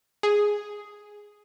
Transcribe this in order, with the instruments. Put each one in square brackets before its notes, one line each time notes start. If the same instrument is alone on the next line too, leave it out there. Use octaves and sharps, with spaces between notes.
[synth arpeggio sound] G#4